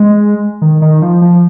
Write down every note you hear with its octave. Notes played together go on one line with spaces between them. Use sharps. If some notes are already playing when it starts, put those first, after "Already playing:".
Already playing: G#3
D#3
D#3
F3
F3